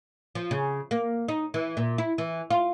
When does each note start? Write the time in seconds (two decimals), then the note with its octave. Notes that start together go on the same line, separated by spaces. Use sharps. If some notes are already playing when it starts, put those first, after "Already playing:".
0.35 F3
0.51 C#3
0.91 A#3
1.28 D#4
1.54 E3
1.77 A#2
1.98 E4
2.18 E3
2.51 F4